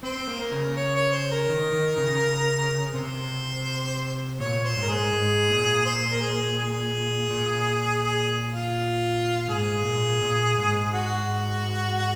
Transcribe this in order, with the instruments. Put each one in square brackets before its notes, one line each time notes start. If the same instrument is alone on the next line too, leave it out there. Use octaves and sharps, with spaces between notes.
[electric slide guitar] C4 [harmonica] C5
[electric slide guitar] A#3
[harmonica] A#4
[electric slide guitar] C#3
[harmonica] C#5
C#5
C5
A#4
[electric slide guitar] D#3
D#3
C#3
[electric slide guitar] C3 [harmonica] C5
[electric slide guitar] A#2 [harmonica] C#5
[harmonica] C5
[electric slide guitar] G#2
[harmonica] A#4
[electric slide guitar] G#2 [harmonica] G#4
[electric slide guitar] G#2
A#2
[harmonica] C5
A#4
G#4
G#4
[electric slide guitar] A#2
[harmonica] G#4
F4
[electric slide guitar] G#2 [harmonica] G#4
[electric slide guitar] A#2
A#2
G#2
[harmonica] F#4